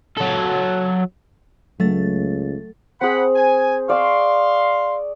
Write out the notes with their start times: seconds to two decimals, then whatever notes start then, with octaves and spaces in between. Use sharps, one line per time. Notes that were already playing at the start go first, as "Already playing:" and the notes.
0.18 F#3 A4
1.80 C#2 F#3 A3 A6
3.01 C4 G#4 F#5 B5
3.35 G#5
3.89 D5 F5 C6 C#6 E6